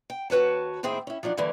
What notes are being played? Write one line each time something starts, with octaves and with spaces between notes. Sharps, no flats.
G5
D#2 F#4 B4 C#5 A5
D#2 A2 C4 E4 G#4 G5
C#4 E4
F3 F#3 D4 D#4
E2 D3 E3 G3 A3 A#3